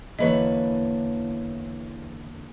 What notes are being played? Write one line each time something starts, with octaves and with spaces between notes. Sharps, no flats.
E2 D3 A#3 E4 B4 C#5 D#5